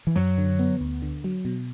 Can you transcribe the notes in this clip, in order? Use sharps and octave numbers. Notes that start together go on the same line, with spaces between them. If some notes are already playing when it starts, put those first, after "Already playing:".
E3
F#2 F#3
D3
B3
D2
D3
F#3
B2